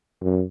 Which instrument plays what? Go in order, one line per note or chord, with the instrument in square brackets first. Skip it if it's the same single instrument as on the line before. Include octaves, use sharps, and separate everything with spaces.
[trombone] F#2